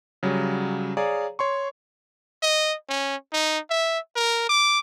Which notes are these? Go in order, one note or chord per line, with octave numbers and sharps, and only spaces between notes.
C#3 F#3 G3
G#4 C#5 D5 F5 A#5
C#5 C6 C#6
D#5
C#4
D#4
E5
A#4
D6